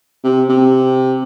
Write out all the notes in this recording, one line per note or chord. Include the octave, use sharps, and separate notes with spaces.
C3
C3